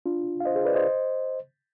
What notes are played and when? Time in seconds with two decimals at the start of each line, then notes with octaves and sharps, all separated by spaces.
0.06 D4 F4
0.40 F5
0.45 C5 D#5
0.55 G#4 C5
0.65 B4 D5
0.75 C5 D#5